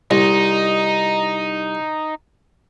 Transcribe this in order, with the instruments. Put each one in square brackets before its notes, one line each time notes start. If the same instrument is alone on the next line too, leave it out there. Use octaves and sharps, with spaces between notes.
[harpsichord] C2 [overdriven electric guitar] D#4